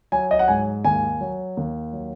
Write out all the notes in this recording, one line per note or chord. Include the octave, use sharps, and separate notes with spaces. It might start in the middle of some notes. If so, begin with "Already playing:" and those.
F#3 G#5
D#5
F#5
G#2 G#5
D#2 G#5
F#3
D#2
F#3